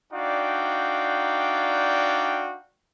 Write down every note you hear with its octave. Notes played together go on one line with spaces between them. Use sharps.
D4 D#4 F#4 D5 F5 G5